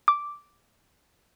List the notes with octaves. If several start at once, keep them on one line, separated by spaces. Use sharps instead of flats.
D6